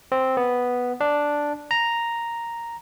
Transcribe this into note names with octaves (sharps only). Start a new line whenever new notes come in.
C4
B3
D4
A#5